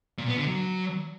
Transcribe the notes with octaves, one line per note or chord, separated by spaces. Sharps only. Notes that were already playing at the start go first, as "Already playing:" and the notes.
A#2
B3
D3
F#3